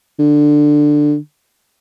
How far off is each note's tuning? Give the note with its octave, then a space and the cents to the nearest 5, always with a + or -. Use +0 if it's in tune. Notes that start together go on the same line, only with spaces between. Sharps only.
D3 +10